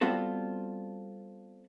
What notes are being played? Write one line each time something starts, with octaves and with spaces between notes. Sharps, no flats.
G3 B3 C4 F4 F#4 A4